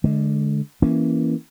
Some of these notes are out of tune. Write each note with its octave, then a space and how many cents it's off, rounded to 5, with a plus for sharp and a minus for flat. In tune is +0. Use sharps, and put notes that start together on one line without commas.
D3 +0 G#3 +30
E3 +0 A#3 +10 C#4 +0